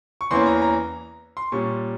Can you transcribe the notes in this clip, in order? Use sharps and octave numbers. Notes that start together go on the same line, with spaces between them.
C#6
E2 E3 A#3 C#4 C6
A#5
A#5
C6
A#2 G3 C#4 C#6